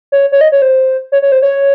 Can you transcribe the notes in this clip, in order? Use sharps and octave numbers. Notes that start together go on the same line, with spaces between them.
C#5
C#5
D#5
C#5
C5
C#5
C#5
C5
C#5